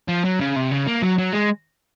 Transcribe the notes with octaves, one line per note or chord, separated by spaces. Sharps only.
F3
F#3
C#3
C3
C#3
A#3
F#3
F#3
G#3